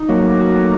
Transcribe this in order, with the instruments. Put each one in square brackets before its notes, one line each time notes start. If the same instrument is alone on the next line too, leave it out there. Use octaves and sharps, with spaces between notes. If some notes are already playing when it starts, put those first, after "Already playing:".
Already playing: [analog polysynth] D#4
[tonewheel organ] F#3 A#3 [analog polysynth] F#4
[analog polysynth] A3
F#4
A3